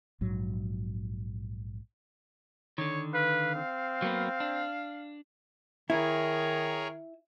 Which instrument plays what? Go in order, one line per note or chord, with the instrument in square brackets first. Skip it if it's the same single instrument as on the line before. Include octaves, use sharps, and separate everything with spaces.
[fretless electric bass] A#1 G#2 F#3
[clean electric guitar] D3 D#3 [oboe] C#5
[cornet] B4 [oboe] F5
[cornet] C4
[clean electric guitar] F#3 A#3 B3
D4
[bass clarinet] D#3 [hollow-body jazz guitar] E4 [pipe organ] G#4 A#4 C#5